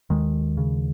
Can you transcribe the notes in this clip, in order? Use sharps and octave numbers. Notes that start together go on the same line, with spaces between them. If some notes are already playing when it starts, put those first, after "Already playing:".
D#2 D#3 G#3
C#3